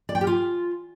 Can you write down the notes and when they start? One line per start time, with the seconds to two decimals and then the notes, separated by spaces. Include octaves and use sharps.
0.09 D5
0.15 G5
0.21 G4
0.27 F4